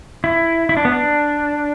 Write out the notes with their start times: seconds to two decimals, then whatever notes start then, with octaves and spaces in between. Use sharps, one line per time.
0.24 E4
0.69 E4
0.77 D4
0.85 B3
0.92 D4